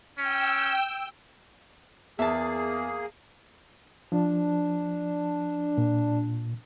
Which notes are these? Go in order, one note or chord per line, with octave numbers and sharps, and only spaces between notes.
C#4 G5 E6
E2 A#3 G#4 E5 A5
F3 D4
A#2